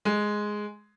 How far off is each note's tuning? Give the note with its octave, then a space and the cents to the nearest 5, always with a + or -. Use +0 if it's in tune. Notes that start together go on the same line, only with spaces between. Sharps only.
G#3 +5